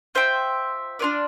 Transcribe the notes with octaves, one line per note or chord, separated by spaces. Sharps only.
F4 C5 E5 G5
D4 F4 B4 D5